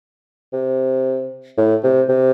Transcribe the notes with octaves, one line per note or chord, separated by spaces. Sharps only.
C3
A2
C3
C3